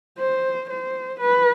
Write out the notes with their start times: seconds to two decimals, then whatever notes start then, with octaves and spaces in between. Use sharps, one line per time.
0.19 C5
0.70 C5
1.20 B4